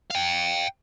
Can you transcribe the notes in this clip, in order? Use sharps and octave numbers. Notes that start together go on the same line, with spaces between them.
F5 G5